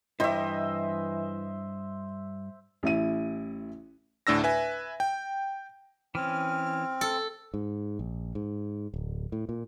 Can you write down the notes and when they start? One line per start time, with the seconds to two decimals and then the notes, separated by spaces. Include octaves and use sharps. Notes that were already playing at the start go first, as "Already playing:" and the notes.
0.20 G2 E3 E4 C5 D#5 E5
2.83 A1 E4 D#7
4.27 D2 A2 D4 E6 A#6
4.44 B4 E5 G#5
5.00 G5
6.15 E3 C4 C#4 F6
7.01 A4
7.54 G#2
7.99 A#1
8.35 G#2
8.94 D1
9.32 A2
9.49 A#2